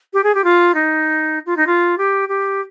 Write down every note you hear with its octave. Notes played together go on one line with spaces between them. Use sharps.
G4
G#4
G4
F4
D#4
F4
D#4
F4
G4
G4